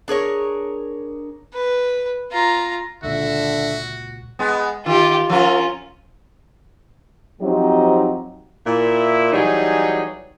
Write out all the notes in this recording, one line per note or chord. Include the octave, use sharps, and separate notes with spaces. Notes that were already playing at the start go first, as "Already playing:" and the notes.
D4 G#4 A#4 C#5
B4
F4 A#5
C#2 A#2 D3 F#4 E5
G#3 B3
D#3 F4 G4
F3 C#4 F4 A#4
F3 F#3 C4 D#4 G4
A#2 E4
E3 F#3 G3 D#4 G#4 C#5